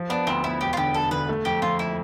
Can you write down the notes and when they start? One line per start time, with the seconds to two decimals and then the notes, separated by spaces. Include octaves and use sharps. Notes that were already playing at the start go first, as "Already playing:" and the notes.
Already playing: F3
0.10 B3 D4
0.27 D2 C4
0.44 B3 E4
0.60 E1 G4
0.73 F4
0.77 D3 G4
0.94 E1 A4
1.11 D3 B4
1.29 A3
1.45 F2 G4
1.62 F2 F4
1.79 E4